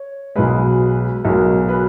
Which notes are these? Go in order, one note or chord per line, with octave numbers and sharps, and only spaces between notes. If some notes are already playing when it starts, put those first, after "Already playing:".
Already playing: C#5
B1 B2 G#3 B4
B1 B2 G#3 A#4
B4